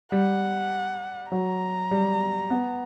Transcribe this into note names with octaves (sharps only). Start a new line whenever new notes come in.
G3 F#5
F#3 A#5
G3
B3